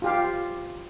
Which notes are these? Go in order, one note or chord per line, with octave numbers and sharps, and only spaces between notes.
F4 G4 F5